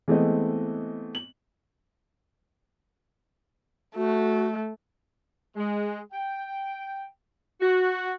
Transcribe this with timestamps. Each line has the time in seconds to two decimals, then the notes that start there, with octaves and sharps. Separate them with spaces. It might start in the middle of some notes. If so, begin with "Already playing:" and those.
0.08 E3 G#3 A3 B3 C4 D#5
1.15 F#7
3.96 A3 F#4
5.56 G#3
6.12 G5
7.61 F#4